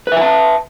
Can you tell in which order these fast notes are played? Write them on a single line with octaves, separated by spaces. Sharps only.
B4 E5 G#5 A5